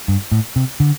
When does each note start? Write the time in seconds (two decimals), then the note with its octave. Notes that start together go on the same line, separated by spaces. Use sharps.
0.08 G2
0.32 A2
0.56 C3
0.80 D3